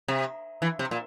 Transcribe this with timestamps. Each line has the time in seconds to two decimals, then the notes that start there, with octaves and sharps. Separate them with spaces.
0.08 C3
0.62 E3
0.79 C3
0.91 A#2